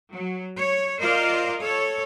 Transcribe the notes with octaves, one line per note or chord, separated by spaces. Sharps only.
F#3
C#5
F4 A#4 C5 D5 D#5 F5
A4 C#5